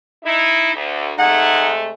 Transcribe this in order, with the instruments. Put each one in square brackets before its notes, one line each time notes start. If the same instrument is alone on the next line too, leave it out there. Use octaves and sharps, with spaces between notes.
[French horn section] D#4 E4
D2
[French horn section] C3 G#3 A3 [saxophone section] D#4 G#4 F#5